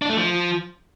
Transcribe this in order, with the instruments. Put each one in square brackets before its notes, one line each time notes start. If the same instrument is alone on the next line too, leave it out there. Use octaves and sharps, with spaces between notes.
[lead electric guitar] D4
A3
F3